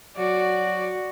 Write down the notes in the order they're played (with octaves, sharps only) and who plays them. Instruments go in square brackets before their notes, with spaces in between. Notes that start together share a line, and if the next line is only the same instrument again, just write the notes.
[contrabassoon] F#3 [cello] F#4 [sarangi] D5